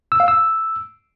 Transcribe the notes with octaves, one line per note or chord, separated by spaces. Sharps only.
E6
F5
E6